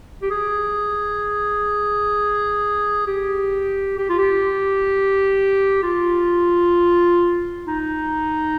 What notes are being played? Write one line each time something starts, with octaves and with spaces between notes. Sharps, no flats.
G4
G#4
G4
G4
F4
G4
F4
D#4